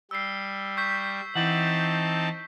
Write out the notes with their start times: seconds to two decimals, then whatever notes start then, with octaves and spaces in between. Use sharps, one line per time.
0.11 G3 E6 C7
0.77 C#6 G6 B6
1.35 E3 C4 D#4 F#5 A5